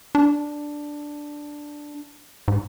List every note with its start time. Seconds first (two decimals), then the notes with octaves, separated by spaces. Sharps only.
0.15 D4
2.48 G#2